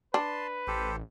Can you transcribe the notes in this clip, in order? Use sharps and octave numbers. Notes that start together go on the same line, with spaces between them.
D4 B4 A5 C6
A1 G4 A4 C5